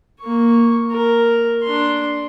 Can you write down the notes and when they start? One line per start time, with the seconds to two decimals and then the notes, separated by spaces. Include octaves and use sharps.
0.21 A#3 C#6
0.91 A#4
1.63 D4 C6